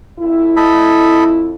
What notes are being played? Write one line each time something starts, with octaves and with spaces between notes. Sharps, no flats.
F2 E4
A4 D#5 B5